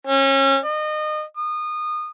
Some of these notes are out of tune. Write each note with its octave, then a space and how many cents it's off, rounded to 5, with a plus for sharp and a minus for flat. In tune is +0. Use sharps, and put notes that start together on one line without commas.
C#4 -30
D#5 -30
D#6 -25